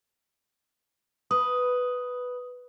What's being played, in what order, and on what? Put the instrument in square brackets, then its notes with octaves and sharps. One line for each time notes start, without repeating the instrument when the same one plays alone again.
[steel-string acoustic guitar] B4 [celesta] D#6